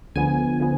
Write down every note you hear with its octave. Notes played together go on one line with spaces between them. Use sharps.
D2 D3 F3 B3 G#5
D3 F3 B3